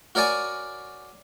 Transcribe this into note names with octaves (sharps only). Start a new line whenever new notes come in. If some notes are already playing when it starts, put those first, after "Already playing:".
F#4 A#4 C#5 D5 G#5